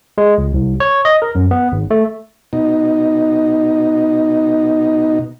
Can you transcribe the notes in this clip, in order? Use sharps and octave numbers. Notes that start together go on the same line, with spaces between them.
G#3
C#2
C2
C#5
D#5
A#4
F#2
B3
G#1
A3
B2 D#4